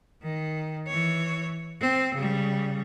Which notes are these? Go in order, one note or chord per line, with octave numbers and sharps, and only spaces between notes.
D#3
E3 C#5
C4
C#3 G3